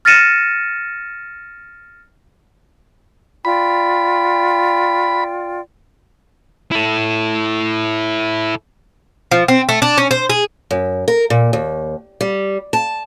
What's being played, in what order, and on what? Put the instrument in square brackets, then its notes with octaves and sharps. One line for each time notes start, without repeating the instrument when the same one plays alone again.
[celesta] F6 A6 A#6 C#7 D#7 E7
[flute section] F4 D5 G5 [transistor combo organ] B5
[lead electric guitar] E4 A4
[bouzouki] F3
C4
A3
D4
C#4
C5
G#4
[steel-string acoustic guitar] F#2
A#4
A#2
D#2
G3
A5